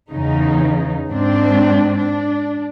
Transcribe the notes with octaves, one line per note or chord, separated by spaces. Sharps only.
E2 C#3 D#4
G#2 C4 D4
D4